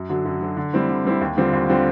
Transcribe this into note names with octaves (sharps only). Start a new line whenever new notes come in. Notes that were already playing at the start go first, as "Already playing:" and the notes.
Already playing: F#2
D3 F#3
F#2
D3 F#3
D3
G3 C4 E4
D3
G3 C4 E4
D#2
D3 G3 C4 F4
D#2
D3 G3 C4 F4